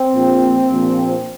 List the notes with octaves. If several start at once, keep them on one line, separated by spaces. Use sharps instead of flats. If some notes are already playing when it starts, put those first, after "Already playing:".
Already playing: C4
A#1 A#2 F3
A#1 A#2 F3